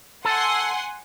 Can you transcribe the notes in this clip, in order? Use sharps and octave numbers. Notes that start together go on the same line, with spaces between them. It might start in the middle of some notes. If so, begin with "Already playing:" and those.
A4 F#5 G#5 C6